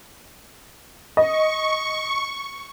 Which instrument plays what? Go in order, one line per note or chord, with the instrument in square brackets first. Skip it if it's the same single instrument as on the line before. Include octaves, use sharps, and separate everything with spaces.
[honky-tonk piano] D#5 [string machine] C#6